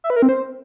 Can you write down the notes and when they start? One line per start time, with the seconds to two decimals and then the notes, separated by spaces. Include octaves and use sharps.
0.04 E5
0.10 B4
0.16 A#4
0.22 C4
0.29 C5